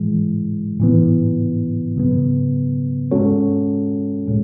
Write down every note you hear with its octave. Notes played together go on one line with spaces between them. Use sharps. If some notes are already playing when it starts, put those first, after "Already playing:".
Already playing: A2 E3 G#3
A2 E3 B3
C#3 F#3 B3
G#3 C#4 F#4 A4 C#5
A2 G#3